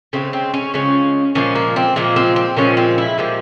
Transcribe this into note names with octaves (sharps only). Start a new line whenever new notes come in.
C#3 F3 G#3 C4
C4
C#4
C#3 F3 G#3 C#4
A#2 F3 G#3 C#4
A#3
C4
A#2 F3 G#3 A#3
C4
C4
A#2 F3 G#3 C#4
C4
E4
A#2 F3 G#3 G4